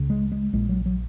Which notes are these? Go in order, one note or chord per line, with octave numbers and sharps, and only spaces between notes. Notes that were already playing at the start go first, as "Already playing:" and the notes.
Already playing: C#2 C#3
G#3
G#3
A#1 A#2 G#3
F#3
F#3